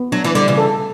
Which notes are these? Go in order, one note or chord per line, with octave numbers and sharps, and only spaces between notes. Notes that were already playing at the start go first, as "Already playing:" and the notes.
Already playing: B3
F#3 D4
E3
D3 G3
C#3 E3
A4